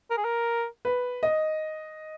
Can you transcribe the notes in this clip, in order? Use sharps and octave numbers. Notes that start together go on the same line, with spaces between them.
A#4
G#4
A#4
B4
D#5